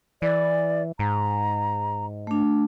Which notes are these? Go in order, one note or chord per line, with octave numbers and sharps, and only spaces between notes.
E3 D5
G#2 A#5
A3 D4